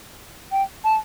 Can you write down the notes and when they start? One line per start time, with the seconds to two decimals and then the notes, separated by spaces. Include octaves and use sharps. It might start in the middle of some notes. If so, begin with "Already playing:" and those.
0.52 G5
0.84 A5